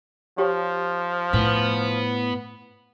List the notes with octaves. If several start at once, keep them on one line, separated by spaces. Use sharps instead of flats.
F3 G4 C#5 G5
A2 B3 G#5